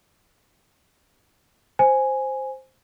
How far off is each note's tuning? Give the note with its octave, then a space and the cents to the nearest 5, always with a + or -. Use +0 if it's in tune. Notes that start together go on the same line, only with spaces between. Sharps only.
C5 +0 G#5 +0